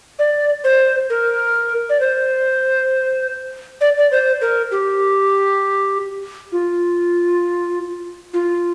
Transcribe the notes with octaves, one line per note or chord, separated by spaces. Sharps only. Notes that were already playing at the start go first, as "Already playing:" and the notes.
D5
C5
A#4
D5
C5
D5
D5
C5
A#4
G4
F4
F4